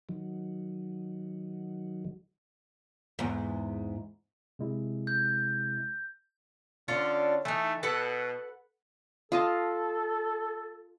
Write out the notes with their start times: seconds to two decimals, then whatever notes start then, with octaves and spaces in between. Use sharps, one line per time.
0.09 D#3 F#3
3.19 E2 G#2
4.59 C3 G#3 E4
5.07 G6
6.88 D3 C#4 D4 F4
7.45 E3 A3 D#4
7.83 B2 A4 B4 F#5
9.32 F4 A4 D#5 A5